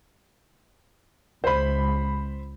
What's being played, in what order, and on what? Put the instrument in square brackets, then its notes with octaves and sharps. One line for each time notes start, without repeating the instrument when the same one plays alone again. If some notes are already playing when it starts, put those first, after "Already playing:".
[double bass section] C#2 [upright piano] C5 B5